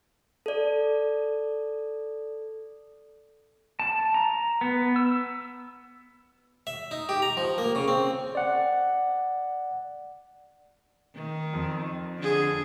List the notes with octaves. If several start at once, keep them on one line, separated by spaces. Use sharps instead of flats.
A4 D5
A5
A#5
B3
E6
E5
D#4
G4
A#5
F3
A#3
C#3
C4
D5 F#5
D#3
F2
D3 G#4